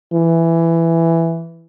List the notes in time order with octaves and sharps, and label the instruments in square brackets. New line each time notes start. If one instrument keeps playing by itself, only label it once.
[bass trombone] E3